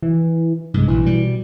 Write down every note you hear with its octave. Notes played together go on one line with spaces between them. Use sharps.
E3
C2 G2 G#3
A#1 E3
B2 G3